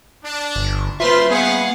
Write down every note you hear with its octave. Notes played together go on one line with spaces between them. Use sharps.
D4
G1
A#3 F4 B4 C5 E5 C6
B3 G#4 F5 F#5